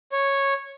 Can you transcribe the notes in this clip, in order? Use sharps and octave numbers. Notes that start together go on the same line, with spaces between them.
C#5